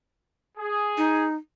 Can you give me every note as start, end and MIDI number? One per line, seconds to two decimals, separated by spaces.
0.58 1.25 68
0.97 1.35 63